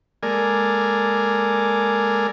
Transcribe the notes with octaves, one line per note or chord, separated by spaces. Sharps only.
G#3 A#3 A4 A#4 D5 G#5